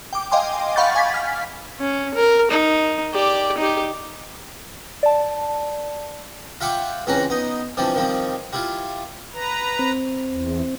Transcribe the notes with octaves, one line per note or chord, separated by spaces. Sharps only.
G5 D6
D#5 F5 G5 G#5 C6 D6
F5 F#5 B5 C#6 G6 A6
F5 G#5 D6 G#6 A6 B6
F6 B6
C#4
A#4
D#4
G4 D5
D#4 G4
D5 A5
F4 E5 F#5 G5 C#6 D6
C#2 E3 C4 C#4 F#5 A#5
B3 D#4
D3 E3 F3 G3 C4
D#3 F3 G3 C4
G3 E4 F4
B4 A#5
C4
E2